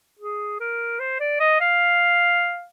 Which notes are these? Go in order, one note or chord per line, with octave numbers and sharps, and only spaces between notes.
G#4
A#4
C5
D5
D#5
F5